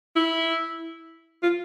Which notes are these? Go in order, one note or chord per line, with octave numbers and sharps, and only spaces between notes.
E4
F4